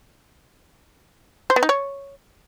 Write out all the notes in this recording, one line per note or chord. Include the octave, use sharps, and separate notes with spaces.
C5
B3
D#4
C#5